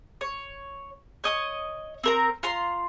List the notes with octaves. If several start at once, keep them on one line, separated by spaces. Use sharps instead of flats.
C#5
C#5 D#5 D#6
C4 A#4 A#5
F4 A#5 C6